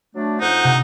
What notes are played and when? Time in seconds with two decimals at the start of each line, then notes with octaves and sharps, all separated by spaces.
0.15 F#3 A3 D4
0.40 F2 D#4 C5 F#5
0.64 C3